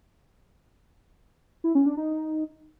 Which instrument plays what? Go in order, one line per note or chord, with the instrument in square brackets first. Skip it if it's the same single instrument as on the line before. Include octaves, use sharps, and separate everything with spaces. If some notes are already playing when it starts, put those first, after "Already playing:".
[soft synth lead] E4
C#4
D4
D#4